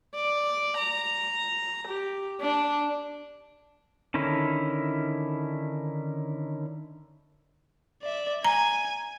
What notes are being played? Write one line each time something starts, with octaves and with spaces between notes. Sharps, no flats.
D5
A#5
G4
D4
D3 D#3 C#4 E4
D5 E5
G#5 A#5